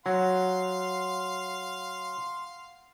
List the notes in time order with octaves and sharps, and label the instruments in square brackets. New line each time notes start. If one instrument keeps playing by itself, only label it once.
[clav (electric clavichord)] F#3 [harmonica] F5 C6 [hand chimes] F#5